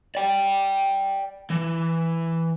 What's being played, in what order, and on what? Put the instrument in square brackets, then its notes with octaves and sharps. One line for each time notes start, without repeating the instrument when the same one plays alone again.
[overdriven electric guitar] D5 G5
E3